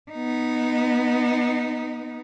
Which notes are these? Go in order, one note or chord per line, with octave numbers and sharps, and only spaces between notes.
B3 D#4